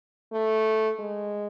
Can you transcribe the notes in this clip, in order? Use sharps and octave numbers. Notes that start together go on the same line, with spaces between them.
A3
G#3